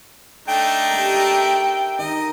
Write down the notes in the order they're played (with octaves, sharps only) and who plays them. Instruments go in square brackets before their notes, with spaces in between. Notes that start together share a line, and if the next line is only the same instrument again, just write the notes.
[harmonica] A3 D4 D#4 [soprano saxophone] G5
[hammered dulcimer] G4 A#4
E5
[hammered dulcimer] D#3 [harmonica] D#5